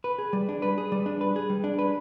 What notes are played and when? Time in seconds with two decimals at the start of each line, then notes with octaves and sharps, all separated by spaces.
0.04 B4
0.19 G#4
0.33 G3
0.49 D4
0.62 B4
0.78 G#4
0.92 G3
1.06 D4
1.21 B4
1.36 G#4
1.50 G3
1.64 D4
1.79 B4